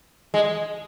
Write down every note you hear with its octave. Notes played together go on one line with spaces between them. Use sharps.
G#3